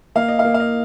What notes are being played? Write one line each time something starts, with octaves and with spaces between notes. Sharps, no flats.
A#3 F5
D#5
F5
A#3
F5
D#5